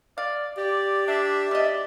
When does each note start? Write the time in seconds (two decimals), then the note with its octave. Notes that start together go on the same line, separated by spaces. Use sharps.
0.18 D5 F5
0.57 G4 D5
1.08 D4 E5
1.51 B2 D5 D#5